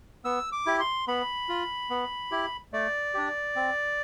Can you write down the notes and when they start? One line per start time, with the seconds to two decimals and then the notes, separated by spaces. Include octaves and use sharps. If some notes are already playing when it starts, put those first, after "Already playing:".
0.25 B3 E6
0.52 D6
0.66 E4 G4
0.80 C6
1.08 B3 B5
1.49 F4
1.90 B3
2.31 E4 G4
2.73 A3 D5
3.14 D4 G4
3.56 C4